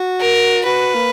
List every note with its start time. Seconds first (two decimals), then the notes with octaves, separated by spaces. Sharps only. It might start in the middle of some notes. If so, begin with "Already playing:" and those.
Already playing: F#4
0.20 A#4
0.65 F#4 B4
0.95 A#3